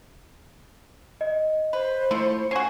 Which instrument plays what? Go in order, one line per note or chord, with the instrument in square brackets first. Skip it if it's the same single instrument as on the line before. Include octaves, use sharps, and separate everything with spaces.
[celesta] D#5
[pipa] B4 [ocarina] C5
[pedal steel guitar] A3 C#5 [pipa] E4 F4
[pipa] C#4 F#4 [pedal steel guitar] C5 G#5 [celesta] C7